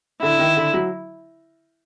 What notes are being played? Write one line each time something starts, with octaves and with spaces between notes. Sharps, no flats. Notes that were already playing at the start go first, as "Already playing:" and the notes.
D3 E4
D#3
D3
F#3